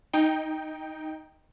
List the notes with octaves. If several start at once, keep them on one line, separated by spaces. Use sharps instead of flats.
D#4 G5